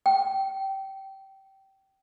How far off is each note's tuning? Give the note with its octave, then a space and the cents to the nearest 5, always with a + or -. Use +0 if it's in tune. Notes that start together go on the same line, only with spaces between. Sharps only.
G5 -20